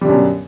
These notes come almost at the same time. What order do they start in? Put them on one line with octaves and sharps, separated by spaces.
G3 D3 F#2 B2